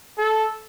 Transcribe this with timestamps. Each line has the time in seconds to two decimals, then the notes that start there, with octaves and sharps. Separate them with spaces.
0.18 A4